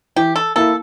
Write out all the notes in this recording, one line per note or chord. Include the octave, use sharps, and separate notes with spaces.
E3 G4
A4
A#3 E4 A4